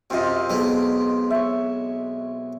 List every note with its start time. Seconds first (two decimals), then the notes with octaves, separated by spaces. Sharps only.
0.10 F#2 C3 C4 F4 D#5
0.50 B1 B2 G#3
1.30 C#5 E5